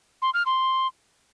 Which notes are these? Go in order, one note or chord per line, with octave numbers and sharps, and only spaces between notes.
C6
F6
C6